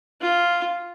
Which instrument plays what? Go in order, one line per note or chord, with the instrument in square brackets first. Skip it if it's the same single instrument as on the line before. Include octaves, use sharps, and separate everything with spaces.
[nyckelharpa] F4